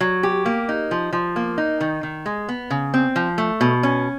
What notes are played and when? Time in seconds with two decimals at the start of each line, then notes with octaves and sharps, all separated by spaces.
0.01 F#3
0.23 G4
0.46 A#3
0.69 D#4
0.91 F3
1.13 F3
1.36 A#3
1.58 D#4
1.81 D#3
2.03 D#3
2.26 G#3
2.49 B3
2.70 C#3
2.94 C4
3.16 F3
3.38 A3
3.61 B2
3.83 C#4